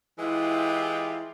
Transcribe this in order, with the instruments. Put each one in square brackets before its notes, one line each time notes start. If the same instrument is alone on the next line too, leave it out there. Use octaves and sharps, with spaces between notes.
[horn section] E3 G#3 E4 F4 G4